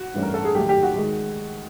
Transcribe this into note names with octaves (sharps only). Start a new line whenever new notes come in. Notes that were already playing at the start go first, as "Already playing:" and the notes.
Already playing: F#4
G2 E3 A3 C#4
A#4
A4
G#4
D#2 D#3 F#3 A3 G4
G4
F#4
D#3 G#3